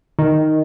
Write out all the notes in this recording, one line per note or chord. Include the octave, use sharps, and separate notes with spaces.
D#3